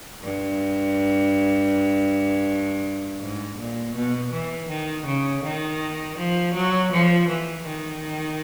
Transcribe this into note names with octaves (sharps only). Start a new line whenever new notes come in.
G2
G#2
A#2
B2
E3
D#3
C#3
D#3
F3
F#3
F3
E3
D#3